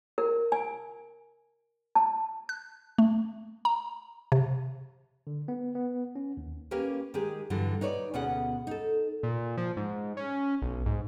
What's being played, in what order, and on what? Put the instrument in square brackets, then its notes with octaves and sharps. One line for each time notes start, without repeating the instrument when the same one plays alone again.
[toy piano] A#4
G#5
A5
[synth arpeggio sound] F#6
A3
A#5
C3
[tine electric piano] D3
B3
B3
C#4
D#2
[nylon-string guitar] A#3 C#4 G4 A#4 B4
D#3 G#3 G4 G#4
G2 D3 E3 F#3
D#4 B4 C#5 D5
D2 B2 B3 C#4 G#4 F#5
D#4 A4
[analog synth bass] A#2
F3
G#2
C#4
B1
G#2